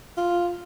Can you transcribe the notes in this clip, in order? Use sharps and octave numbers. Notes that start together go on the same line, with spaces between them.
F4